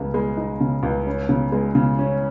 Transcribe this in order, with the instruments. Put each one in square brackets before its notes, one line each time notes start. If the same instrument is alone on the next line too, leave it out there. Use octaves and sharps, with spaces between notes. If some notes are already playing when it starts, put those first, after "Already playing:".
Already playing: [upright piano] C#2 C#3
G#3
D#4
C#3
C#2
C#4
C#3
G#3
C#3
C#4